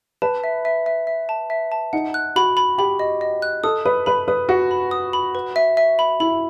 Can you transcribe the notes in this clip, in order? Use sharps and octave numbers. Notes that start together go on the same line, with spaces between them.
B4 A5
E5
E5
E5
E5
A5
E5
A5
D#4 F#5
F#6
F#4 B5
B5
G4 B5
D#5
D#5
F#6
A4 D#6
B4 D#6
B4 B5
B4 D#6
F#4 F#5
B5
D#6
B5
B4
E5
E5
B5
E4 B5